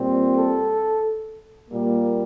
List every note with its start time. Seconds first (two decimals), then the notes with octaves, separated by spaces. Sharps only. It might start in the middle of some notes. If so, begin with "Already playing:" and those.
Already playing: A#2 G3 C4
0.35 A4
1.69 A#2 G3 A#3